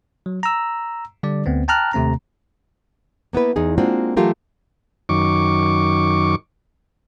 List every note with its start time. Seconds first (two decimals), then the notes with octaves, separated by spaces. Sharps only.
0.26 F#3
0.43 A#5 E6
1.23 D3 G3 D4 D5
1.46 D2 B3 C4
1.68 G5 A5 A#5 F6 F#6
1.93 D#2 C3 A3 C4 A#5
3.33 A#3 B3 E4 B4
3.56 E2 D#4 G#4
3.78 G#3 A#3 C4 D4 F4 F#4
4.17 E3 F#3 A3 F4 G4 A#4
5.09 F#2 D#3 C#6 D6